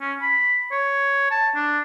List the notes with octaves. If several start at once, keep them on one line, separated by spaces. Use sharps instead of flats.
C#4
B5
C#5
A5
D4